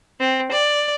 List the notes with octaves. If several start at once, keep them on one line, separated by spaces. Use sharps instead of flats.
C4
D5